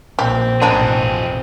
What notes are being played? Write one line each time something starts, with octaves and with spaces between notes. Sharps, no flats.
A#1 C4 G4
A1 F2 B2 D#3 G#3 D4 D#4 G#4